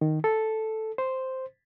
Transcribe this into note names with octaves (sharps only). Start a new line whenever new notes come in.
D#3
A4
C5